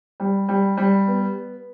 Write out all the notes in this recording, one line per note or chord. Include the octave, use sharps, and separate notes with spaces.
G3
G3
G3
B3